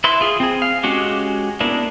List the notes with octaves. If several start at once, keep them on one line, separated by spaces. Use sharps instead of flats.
E4 B4 E5 C6
F4 G#4
C4 G#4
F5
G#3 C#4 F#4 G4
A#3 B3 D4 E4